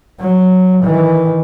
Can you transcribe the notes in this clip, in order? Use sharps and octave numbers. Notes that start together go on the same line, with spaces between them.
F#3
D#3 E3